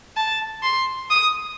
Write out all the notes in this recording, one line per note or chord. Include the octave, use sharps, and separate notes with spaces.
A5
C6
D#6